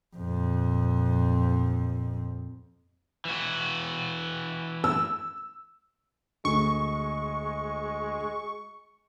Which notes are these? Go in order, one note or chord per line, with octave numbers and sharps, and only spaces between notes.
F2 A#2
E3 F#4
E6
D2 G#3 C#6